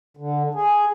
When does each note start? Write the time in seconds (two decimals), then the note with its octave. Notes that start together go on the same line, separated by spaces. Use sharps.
0.17 D3
0.54 G#4